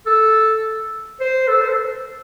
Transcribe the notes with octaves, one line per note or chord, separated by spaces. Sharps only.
A4
C5
A4
C5
A4